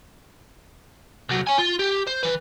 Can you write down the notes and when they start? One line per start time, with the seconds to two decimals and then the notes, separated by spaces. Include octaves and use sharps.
1.29 C2 F#3
1.47 C#5 G#5
1.59 F4
1.79 G4
2.07 C5
2.23 E3 B4